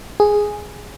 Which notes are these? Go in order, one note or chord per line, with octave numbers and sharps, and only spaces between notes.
G#4